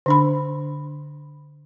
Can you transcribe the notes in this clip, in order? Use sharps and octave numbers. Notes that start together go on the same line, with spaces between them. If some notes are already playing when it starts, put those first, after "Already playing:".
D3 D4 B5